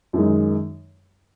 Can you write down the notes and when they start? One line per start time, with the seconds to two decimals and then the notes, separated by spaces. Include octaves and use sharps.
0.13 F#2 D#3 G#3